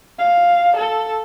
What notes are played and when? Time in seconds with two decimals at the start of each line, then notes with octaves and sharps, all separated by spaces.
0.19 F5
0.77 A4